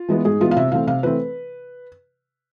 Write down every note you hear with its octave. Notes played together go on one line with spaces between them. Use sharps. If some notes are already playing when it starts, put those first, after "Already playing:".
Already playing: F4
E3 G#3 B3
G#2 G#4
E3 G#3 B3 F4
F5
C3 E5
E3 A3 C4 F5
C3 F5
E3 A3 C4 B4